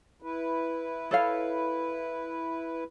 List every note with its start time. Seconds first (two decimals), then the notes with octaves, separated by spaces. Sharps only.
0.22 E4 B4
1.11 A4 C#5 F5